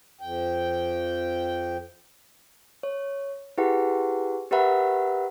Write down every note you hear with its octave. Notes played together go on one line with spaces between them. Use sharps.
F2 G5
C#5
E4 G4 G#4 B4 F#5
G4 A#4 B4 E5 F#5 B5